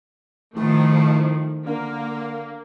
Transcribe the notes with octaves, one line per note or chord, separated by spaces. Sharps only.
A2 D#3 F3 A3
D3 A#3